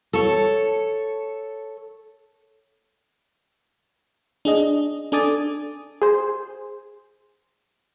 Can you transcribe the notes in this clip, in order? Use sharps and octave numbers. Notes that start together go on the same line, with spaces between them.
A4 C#5
D4 G#4 D#5
D4 A4 G#5 D6 D#6 A6
G#4 C5